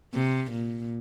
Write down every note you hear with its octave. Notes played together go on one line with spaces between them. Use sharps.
C3
A#2